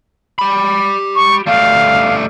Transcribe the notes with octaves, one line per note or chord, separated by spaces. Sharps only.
G4 B5
C#6
G3 A3 F5